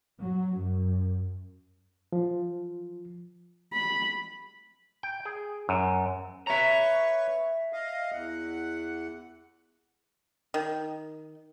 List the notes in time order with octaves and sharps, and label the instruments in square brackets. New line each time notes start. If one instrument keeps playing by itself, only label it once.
[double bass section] F#3
F#2
[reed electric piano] F3
[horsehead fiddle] B5
[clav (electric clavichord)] G5
G#4
F#2
[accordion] B4 C#5 C#6 [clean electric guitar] E5 A#5
[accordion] D#5 F5
E2 F#5
[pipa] D#3